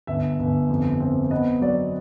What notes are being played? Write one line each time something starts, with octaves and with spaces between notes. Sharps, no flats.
G1 E5
G1
F2
C4
B3 D#5
F#3 D5